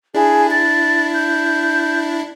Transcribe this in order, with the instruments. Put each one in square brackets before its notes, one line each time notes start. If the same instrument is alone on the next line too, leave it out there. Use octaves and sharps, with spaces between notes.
[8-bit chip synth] D4 E4 [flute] G#4
[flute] A6
G6